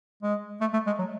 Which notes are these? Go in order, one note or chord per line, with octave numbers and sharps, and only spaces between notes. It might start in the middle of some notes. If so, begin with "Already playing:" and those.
G#3
A3
A3
G#3
F#3